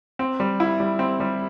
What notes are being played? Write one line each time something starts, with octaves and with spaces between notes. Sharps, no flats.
C4
G3
E4
G3
C4
G3